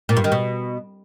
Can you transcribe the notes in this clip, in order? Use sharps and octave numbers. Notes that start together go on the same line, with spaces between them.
A#2
G2
D#3
B2